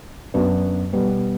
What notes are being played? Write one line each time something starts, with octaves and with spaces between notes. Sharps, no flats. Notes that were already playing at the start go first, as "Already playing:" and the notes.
F#2 F#3 B3 D4 F#4
B2 G3 B3